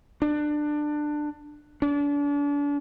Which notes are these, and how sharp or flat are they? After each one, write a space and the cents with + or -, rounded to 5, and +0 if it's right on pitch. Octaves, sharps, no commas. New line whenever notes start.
D4 +20
D4 -35